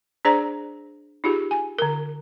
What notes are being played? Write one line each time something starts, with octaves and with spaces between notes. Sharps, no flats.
D4 G#4 C5 D5 A#5 C6
D#4 F4 G4 G#4
G#5
D3 A#4